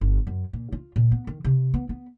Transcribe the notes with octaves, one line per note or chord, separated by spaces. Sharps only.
G1
F#2
A#2
F4
A#2
B3
D#3
C3
B3
B3